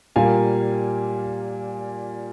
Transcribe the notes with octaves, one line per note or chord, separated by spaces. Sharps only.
A#2 G3 A#3 F5 G#5